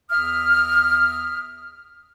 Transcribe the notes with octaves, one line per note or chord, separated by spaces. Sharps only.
E2 E5 D#6 F6